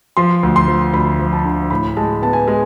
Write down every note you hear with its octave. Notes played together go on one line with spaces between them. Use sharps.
F3 C6
D2
C6
F3
D2 B5
F3
A5
D3
A2 B5
G#3 A5
B3 A5
G#5
G#3